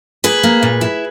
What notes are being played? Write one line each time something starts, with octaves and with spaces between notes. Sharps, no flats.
A#3 G#4 B4
A#3
A#2
E4